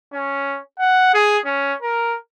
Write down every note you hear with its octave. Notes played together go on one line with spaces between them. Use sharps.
C#4
F#5
G#4
C#4
A#4